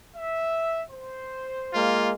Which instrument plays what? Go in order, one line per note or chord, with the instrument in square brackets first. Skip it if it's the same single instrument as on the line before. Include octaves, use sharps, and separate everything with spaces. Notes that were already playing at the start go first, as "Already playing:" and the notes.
[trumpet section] E5
C5
[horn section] G#3 A#3 F4